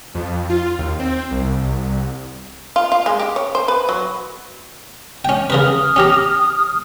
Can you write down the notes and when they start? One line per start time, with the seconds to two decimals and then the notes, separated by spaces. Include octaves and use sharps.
0.15 F2
0.50 F4
0.78 D#2
0.99 C4
1.31 C2
2.76 F4
2.92 F4
3.06 G#3
3.19 G4
3.36 C#5
3.55 C5
3.68 B4
3.89 F#3
5.25 C#4 G5
5.50 C#3 A#4 B4 D#6 F6
5.96 C#4 G4 A#5